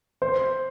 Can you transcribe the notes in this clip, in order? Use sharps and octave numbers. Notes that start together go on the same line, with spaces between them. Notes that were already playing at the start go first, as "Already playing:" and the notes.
C5